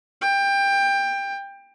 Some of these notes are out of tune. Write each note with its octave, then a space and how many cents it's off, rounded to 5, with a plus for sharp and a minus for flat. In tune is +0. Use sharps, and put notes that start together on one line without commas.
G5 +20